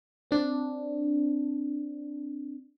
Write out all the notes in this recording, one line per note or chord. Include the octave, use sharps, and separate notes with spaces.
C4 D4